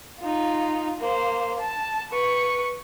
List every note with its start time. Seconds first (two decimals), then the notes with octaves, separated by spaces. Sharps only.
0.20 D#4 F4
1.00 A#3 C5
1.60 A5
2.11 B4 C#6